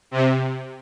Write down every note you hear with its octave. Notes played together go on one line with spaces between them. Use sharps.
C3